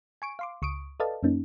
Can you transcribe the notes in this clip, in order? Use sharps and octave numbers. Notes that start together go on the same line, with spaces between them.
G#5 C#6 D7
F5 C6 D6
C#2 C#6 D#6 D7
A4 B4 D5 D#5 F5 A5
F#2 A#3 C#4 D#4